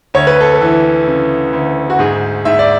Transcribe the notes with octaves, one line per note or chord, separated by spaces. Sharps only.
D2 C#5
B4
A4
B4
E3
C#3
D2
F#4
G#2 G#4
G#2 E5
D5